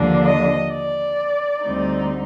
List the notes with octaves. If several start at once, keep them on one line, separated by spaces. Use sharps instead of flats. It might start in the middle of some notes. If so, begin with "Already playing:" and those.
Already playing: D#2 D3 F3 A#3 D4
D#5
D5
D2 D3 G3 C4 D#4